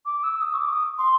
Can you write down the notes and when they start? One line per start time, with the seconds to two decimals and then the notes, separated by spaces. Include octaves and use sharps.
0.06 D6
0.23 E6
0.41 D#6
0.54 C#6
0.59 D6
0.72 D#6
0.98 C6